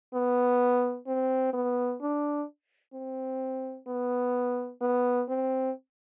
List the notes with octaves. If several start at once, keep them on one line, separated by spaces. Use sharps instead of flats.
B3
C4
B3
D4
C4
B3
B3
C4